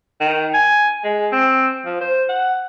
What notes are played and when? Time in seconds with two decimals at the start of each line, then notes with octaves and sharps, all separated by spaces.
0.20 D#3
0.54 G#5
1.04 G#3
1.32 C4
1.86 F3
2.01 C5
2.29 F#5